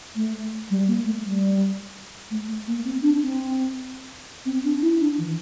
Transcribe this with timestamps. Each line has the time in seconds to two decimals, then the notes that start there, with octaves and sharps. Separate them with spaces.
0.16 A3
0.70 G3
0.88 A#3
1.05 A3
1.24 G3
2.31 A3
2.48 A3
2.67 A#3
2.85 C4
3.03 D4
3.21 C4
4.45 C4
4.65 D4
4.82 E4
5.00 D4
5.18 E3